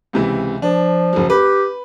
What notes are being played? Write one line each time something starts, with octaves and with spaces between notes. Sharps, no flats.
C#2 C3 E3
F3 D4
F#1 F#3
G4 B4